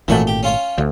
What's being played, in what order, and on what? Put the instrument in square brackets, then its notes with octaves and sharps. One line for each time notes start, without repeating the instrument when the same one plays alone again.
[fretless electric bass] G#1 A#2 A3 [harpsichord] E3 F#3 C#6
[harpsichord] G4
C#4 F4 C#5
[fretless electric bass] D2